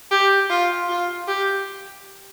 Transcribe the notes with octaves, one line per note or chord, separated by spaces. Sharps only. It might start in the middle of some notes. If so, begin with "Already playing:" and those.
G4
F4
F4
G4